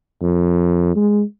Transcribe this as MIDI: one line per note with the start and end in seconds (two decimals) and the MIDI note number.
0.22 0.95 41
0.96 1.22 56